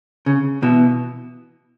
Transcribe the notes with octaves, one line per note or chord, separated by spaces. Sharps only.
C#3
B2 E3